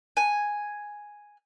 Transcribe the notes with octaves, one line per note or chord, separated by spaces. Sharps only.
G#5